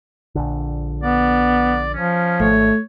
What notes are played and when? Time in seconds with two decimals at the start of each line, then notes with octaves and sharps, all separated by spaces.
0.35 A#1 D3
1.03 B3 D5
1.95 F3 C#4
2.40 G#1 A3 C#5